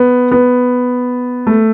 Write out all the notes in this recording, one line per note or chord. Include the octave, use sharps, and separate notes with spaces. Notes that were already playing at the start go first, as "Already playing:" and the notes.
Already playing: B3
B3
A3